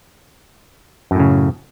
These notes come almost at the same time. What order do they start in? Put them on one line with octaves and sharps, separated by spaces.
F#2 A2 C#3